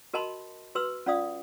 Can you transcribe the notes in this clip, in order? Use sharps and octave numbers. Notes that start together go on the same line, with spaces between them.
F#4 A#4 D#5 A5 B5 C6
F#4 B4 C6 E6
C#4 F4 D5 F5 D#6